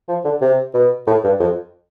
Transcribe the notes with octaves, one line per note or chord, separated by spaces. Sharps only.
F3
D3
C3
B2
A2
G2
F2